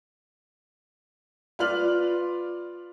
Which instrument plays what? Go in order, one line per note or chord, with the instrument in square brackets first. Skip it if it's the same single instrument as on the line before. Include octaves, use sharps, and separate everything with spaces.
[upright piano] F4 B4 D5 F6 F#7